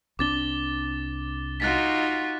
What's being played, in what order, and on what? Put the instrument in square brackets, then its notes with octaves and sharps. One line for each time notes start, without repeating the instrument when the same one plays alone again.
[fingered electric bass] C2 C4 D4 [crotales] D6 A6 G7
[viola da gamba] D#4 F4 F#4 [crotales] F#6 A6 B6